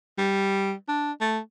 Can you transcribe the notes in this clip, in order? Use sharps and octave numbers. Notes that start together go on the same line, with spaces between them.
G3
D4
A3